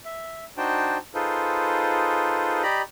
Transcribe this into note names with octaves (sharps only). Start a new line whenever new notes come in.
E5
D4 D#4 F#4 C5 G5 A5
D#4 F4 G#4 A4 B4 C5
G4 D5 D#5 A#5 B5